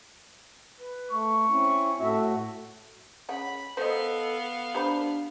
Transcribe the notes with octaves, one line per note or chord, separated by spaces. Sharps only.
B4
A3 C#6
C4 C#4 E4
A2 A3 F#4 E5
C#3 F#5 B5
B3 A4 C5 D#5 F5
D4 G4 C5 B5